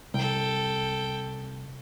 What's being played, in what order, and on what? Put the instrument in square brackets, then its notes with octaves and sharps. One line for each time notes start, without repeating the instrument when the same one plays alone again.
[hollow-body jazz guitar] C2 [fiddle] A4 G5